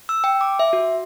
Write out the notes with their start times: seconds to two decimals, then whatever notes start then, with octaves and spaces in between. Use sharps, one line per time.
0.09 E6
0.24 G5
0.41 D6
0.59 E5
0.73 F#4